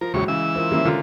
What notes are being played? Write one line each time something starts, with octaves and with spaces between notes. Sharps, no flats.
F3 A#4
A#1 E2 C#3 F#3 G#3 G4 C#6
C#3 E3 E6
F4 A#4 C5
D#3 G3 A#3 C#4 E4 E5
D3 F4 A#4